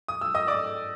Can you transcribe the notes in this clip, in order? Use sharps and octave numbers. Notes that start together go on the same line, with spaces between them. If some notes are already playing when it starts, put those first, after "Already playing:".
D#6
E6
D#5 D#6
D5 D6